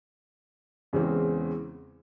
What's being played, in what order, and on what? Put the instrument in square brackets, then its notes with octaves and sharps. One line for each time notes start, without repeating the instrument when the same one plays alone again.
[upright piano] E2 C#3 E3 G#3 C4